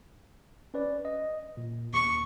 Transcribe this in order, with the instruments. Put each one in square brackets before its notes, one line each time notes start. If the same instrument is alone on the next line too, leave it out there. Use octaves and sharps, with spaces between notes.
[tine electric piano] C#4 B4 D5
D#5
A#2
[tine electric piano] D#2 [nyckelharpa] C#6